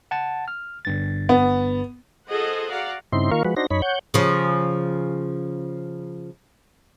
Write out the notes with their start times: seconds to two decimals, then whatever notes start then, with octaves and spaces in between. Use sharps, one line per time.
0.11 F#5 A5 A6
0.48 F6
0.85 G1 G2 A6
1.29 B3
2.27 F4 G#4 A4 C5 D#5 F#5
2.70 F#4 D5 F5 F#5 A#5
3.12 G2 C#3 C4 D#4 E4 C6
3.31 D#3 A#3 F4 A#4 F5 C#6
3.45 F3 G#3 F#4 B4
3.56 D4 D#4 F#4 C5 A#6
3.70 F#2 D#4 C#5 B5
3.82 C#5 F#5 G6
4.14 C#3 F3